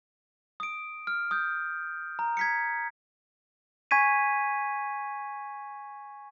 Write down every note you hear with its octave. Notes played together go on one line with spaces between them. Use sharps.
D#6 D7
F6
D#6 G6
A#5
G#6 B6 C#7
G#5 C#6 G#6 B6 D#7